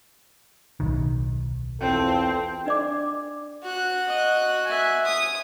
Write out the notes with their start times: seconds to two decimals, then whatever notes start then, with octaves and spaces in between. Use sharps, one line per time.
0.80 D1 B1 D#3
1.81 E2 C4 F4 A4
2.66 D4 D5 D6
3.63 F#4 F#6
4.08 D#5
4.66 E5 G#5
5.06 D#6